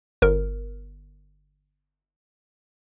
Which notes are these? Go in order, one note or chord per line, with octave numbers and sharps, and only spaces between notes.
G1 A#4